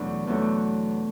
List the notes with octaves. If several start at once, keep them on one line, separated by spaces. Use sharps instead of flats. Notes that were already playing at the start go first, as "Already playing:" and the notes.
Already playing: E2 B2 F#3 A3 D4
E2 B2 F#3 A3 D4